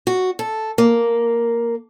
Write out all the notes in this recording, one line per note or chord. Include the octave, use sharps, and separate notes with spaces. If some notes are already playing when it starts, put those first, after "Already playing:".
F#4
A4
A#3